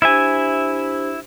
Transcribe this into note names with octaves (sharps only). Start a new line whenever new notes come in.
D4 E4 G4 C5 E5 G#5